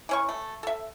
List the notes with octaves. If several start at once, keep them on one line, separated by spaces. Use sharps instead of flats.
E3 C#4 C#6
A3
A4 E5